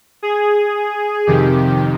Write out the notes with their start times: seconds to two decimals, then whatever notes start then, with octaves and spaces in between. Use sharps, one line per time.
0.23 G#4
1.27 F2 C3 D#3 G4